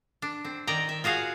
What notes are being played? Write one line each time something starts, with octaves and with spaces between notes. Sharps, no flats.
D4
C4
D#3 D5 G5 A#5
E5
F4 F#4 G#4 F5